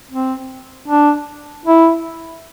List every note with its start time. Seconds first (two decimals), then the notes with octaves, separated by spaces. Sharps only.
0.11 C4
0.88 D4
1.66 E4